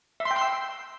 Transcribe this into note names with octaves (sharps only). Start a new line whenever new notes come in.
E5
C6
G5
C6
E6